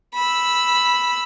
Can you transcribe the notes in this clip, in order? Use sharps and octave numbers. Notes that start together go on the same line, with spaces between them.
B5 E6